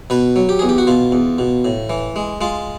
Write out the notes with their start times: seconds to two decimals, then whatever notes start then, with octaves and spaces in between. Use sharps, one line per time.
0.10 B2 B4
0.36 F#3
0.49 G4
0.59 E2 G#4
0.69 G4
0.78 F#4
0.87 B2 F4
1.12 E2
1.38 B2
1.65 A2
1.90 E3
2.16 G#3
2.41 G#3 F4